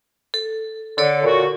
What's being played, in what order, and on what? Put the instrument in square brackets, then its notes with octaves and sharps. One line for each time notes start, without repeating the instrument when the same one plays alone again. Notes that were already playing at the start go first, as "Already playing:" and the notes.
[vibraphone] A4
[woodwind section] D3 [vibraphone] A4 C#5 D5
[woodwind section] A#2 F#4